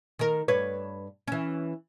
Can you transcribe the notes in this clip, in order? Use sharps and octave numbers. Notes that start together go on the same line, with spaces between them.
D#3 A#4
G2 B4 C#5
E3 C#4